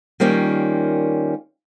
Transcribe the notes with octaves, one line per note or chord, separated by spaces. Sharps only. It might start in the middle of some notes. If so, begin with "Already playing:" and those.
D#3 G3 A#3 C#4 F4